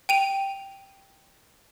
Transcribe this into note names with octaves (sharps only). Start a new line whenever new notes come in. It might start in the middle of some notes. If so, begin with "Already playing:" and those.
G5 D#7 F7